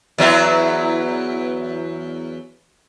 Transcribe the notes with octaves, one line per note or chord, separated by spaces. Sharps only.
E2 F#3 E4